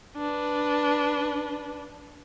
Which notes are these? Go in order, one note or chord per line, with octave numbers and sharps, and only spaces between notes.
D4 B4